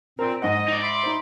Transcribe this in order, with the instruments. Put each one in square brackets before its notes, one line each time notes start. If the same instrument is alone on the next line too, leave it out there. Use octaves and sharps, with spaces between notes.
[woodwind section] A#2 C4 [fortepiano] A#4
[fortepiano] G#2 F#5 [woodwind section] D#5
[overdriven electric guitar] D#4 D5
[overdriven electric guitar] D5 [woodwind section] E5 B5 C6
[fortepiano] D#4 C5